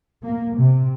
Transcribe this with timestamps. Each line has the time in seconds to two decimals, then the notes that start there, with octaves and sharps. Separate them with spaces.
0.24 A#3
0.58 C3